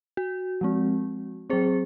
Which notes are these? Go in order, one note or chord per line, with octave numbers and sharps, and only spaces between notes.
F#4
F3 G#3 C4
F#3 C4 G#4 C5